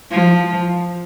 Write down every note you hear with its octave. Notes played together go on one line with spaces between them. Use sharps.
F3